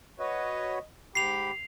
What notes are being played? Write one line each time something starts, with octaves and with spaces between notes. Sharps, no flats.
F#4 B4 C#5 D#5
G#2 G4 B5 C7 F7